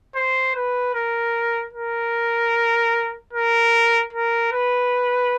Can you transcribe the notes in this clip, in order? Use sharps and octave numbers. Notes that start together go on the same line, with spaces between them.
C5
B4
A#4
A#4
A#4
A#4
B4